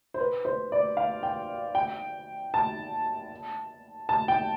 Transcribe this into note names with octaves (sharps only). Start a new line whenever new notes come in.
C5
B4
C5
D5
F5
G5
G5
A5
A5
G5